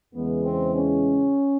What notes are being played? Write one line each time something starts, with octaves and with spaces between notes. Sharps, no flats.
E2 C#3 E3 G#3 B3
C4
C#4